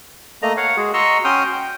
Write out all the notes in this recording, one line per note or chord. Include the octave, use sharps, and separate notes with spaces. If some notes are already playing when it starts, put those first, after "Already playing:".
A3 A#3 D#5 A#5
C#5 F5 F#5
G#3 F#4 G#4
F#4 D#5 A#5 C6 C#6 E6
C#4 F#4 G5 C6 D#6 F6
G5